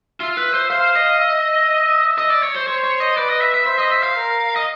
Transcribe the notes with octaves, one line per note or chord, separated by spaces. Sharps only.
F4 E5
B4
C5
C5 F5
D#5
E5
D#5
D5
C#5
C5
C5 C#5
C#5
D#5
B4 D5
D#5
E5
E5
C5 E5
D#5
E5
F5
A#4
D#5